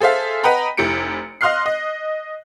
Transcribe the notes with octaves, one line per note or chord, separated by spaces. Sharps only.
G#4 A4 C5 E5 F5
B4 D#5 F#5 G5 A#5 B5
F1 E4 G4 C#7 D7
D#5 F5 C6 F6 F#6 C7
D#5